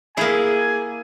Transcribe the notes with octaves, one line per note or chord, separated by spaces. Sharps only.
A#3 E4 G#4 G#5